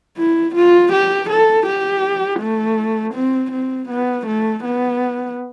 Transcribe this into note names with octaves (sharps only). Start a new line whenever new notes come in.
E4
F4
G4
A4
G4
A3
C4
C4
B3
A3
B3